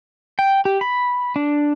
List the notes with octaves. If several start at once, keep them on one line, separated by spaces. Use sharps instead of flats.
G5
G4
B5
D4